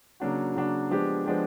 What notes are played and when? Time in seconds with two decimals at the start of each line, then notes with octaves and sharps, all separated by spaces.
0.20 C#3 F#3 A#3 D4 F#4
0.56 C#3 F#3 A#3 D4 F#4
0.90 F3 G#3 B3 D4 G4
1.26 F3 G#3 B3 D4 G4